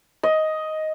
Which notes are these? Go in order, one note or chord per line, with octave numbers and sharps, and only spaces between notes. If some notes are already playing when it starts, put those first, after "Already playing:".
D#5